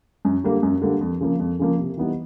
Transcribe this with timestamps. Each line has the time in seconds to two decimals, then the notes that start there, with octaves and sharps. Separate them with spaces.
0.25 F#2
0.44 D3 G3 A#3
0.63 F#2
0.82 D3 G3 A#3
1.01 F2
1.21 C#3 F3 A#3
1.40 F2
1.59 C#3 F3 A#3
1.78 C3
1.97 E3 G3 B3 D#4